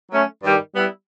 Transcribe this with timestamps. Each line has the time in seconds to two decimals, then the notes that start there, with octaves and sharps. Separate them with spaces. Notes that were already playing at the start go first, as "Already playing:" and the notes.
0.11 F#3 A3 C#4
0.43 G2 D#3 G3
0.74 G3 B3 E4